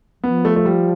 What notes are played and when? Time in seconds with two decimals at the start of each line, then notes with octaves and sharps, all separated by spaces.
0.23 F3 B3
0.45 A3
0.56 A3
0.65 G3